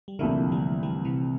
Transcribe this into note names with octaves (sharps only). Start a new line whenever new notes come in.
G3
C2 A#2 D3 F3 A3 E4 A#4
E3 G3
E3 G3
C3 E3